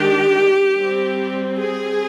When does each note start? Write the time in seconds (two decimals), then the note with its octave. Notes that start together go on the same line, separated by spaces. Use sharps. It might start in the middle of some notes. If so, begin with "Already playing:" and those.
Already playing: D#3 G#3 D4 G4
0.75 G3 C4
1.59 G#4